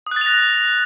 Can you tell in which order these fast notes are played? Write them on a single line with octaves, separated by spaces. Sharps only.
D#6 F#6 A6 F7 A#6